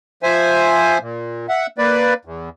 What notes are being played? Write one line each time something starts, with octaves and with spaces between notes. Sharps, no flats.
F3 C5 E5 G#5
A#2
E5 F#5
A#3 B4 D5
E2